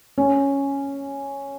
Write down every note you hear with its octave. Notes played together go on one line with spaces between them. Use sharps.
C#4